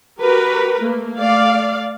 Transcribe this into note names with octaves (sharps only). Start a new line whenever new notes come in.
F#4 G4 A#4 B4
A3 A#3
A3 D5 F5